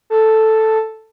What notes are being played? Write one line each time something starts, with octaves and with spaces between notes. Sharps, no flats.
A4